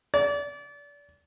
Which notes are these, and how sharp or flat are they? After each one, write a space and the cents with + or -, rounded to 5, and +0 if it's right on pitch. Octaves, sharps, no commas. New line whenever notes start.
D5 -30